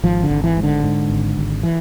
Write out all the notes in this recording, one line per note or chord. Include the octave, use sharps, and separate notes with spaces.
G#1 F3
D3
G#1
E3
G#2
D3
G#2
G#1
G#1
E3